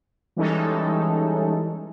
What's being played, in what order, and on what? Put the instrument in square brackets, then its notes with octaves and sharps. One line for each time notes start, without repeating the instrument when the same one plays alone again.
[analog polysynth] E3 G3 G#3 C#4 D#4 A4